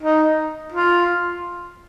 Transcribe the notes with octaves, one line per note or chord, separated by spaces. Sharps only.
D#4
F4